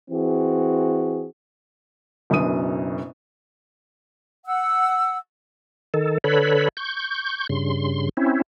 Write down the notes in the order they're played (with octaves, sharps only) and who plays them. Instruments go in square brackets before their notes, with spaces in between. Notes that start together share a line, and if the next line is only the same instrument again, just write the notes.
[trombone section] E3 C4 F#4 G#4
[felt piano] F#1 F#2 B2 D4 D#6 D#7
[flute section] F#5 E6
[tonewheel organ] D#3 A4
D3 A4 B4 C#5 B5
C#6 G6
G2 C#3 C6
C4 C#4 E4